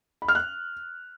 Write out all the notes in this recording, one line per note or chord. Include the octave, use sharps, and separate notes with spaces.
B5
F6
F#6